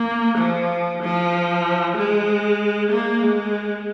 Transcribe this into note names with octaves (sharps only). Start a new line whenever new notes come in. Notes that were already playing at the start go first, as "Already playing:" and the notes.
Already playing: A#3
F3
F3
G#3
A#3
G#3